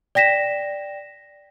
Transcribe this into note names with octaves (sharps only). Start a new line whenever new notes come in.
D5 G5 A#6 B6 E7